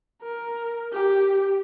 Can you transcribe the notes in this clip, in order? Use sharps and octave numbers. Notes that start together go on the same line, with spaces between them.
A#4
G4